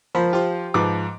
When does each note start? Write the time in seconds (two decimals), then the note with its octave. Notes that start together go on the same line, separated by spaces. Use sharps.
0.15 F3 A#4 C5 B5
0.33 F4 G4 C5
0.74 G#2 F3 B4 D6